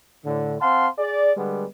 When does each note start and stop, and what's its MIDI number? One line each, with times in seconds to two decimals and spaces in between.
0.25 0.57 45
0.25 0.57 50
0.61 0.87 60
0.61 0.87 77
0.61 0.87 78
0.61 0.87 81
0.61 0.87 84
0.98 1.31 68
0.98 1.31 74
1.36 1.65 50
1.36 1.65 55
1.36 1.65 56
1.36 1.65 59